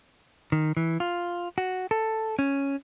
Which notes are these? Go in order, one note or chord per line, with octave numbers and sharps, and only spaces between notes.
D#3
E3
F4
F#4
A4
C#4